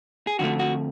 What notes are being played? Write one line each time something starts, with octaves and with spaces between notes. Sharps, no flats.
G#4
F2 D3 F3 A3 F#4
F#4